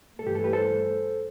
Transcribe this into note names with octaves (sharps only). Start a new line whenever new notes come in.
G2 E3 A3 A4
G4
A4
G4 B4
A4 C5